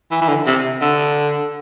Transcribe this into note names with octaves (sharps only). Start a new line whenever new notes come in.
E3
E3
D3
C3
D3